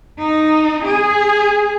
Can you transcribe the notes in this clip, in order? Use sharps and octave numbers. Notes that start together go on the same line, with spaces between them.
D#4
G#4